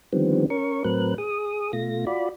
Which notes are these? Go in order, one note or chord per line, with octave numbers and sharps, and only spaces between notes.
D3 D#3 F3 G3 B3 C4
C#4 A#4 C#6
A2 F#3 C4 A#4 B4 F#6
G#4 D#6
B2 A3 F4 A#6
F4 F#4 D5 B5